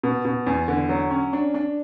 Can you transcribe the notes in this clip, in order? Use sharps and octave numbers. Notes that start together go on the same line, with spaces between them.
B2
B2
E2
D3
F#3
C#4
D4
D4